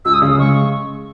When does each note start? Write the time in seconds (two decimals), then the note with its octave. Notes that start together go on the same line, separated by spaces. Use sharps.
0.05 C#2 E6
0.14 D#6
0.22 C#3 E6
0.31 D#6
0.39 G#3 C#6